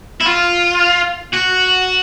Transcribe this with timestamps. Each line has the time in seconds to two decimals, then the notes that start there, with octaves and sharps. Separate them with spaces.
0.21 E4
0.26 F4
1.33 F#4